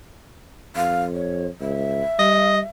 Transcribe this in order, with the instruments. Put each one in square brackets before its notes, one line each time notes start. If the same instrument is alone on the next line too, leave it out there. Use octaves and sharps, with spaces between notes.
[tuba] F2 [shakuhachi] F5
[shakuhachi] C#5
[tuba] C#2 [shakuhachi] E5
[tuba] G3 [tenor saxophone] D#5